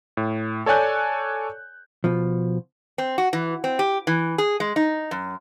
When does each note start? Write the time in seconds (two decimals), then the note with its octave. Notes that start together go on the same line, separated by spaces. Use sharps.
0.17 A2
0.66 A4 C#5 D5 G#5 F#6 G6
2.04 B2 F3
2.98 C4
3.18 F#4
3.33 E3
3.64 C4
3.79 G4
4.07 E3
4.38 G#4
4.60 G#3
4.76 D#4
5.11 F#2